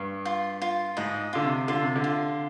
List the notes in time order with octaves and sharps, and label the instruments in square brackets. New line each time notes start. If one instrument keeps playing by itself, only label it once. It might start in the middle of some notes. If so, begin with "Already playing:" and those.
Already playing: [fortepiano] G2
[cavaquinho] F4
F4
[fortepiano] G#2 [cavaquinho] D#5
[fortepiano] D3 [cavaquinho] F4
[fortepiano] C3
[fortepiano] D3 [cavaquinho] F4
[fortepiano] C3
D3
[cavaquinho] F4